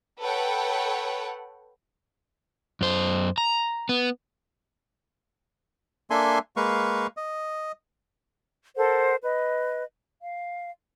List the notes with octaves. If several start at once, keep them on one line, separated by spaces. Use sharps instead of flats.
A4 B4 C#5 F#5 G5
F#2 C5
A#5
B3
A#3 D4 A4 E5 G#5 C6
G#3 A#3 B4 F5 C#6
D#5
A4 A#4 C5 F#5
B4 D#5
F5